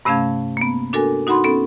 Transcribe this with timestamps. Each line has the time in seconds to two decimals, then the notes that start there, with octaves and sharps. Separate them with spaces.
0.05 G2 C3 A3 C#4 F5 G#6
0.57 A#3 B3
0.93 D4 F#4 A4 A#4 G#5
1.27 D#4 F#4 F#5 B5 C6
1.44 B3 C#4 A4